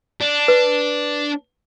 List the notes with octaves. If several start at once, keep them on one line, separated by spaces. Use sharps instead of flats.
D4
B4